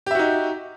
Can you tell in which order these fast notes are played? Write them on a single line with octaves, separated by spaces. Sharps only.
G4 E5 F#4 D#4